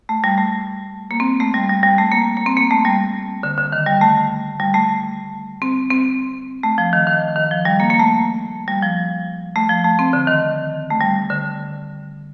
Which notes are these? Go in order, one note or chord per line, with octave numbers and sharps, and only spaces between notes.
A3
G3
A3
A#3
C4
A3
G3
G3
G3
A3
A#3
A#3
C4
A#3
A3
G3
D3
D3
D#3
G3
A3
G3
A3
C4
C4
A3
F3
D#3
D#3
D#3
F3
G3
A#3
A#3
A3
G3
F3
A3
F3
A3
C4
D3
D#3
A3
G3
D3